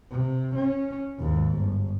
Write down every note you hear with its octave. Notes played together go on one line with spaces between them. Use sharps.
C3
C#4
D#2 G#2
G1